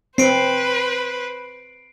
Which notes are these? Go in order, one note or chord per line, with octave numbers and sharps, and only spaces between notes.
C4 B4 C5 C7 D7